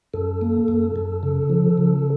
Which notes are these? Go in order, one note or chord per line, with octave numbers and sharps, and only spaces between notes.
F#2 A4
A#3
F#2
F#2
C#3
F3
C#3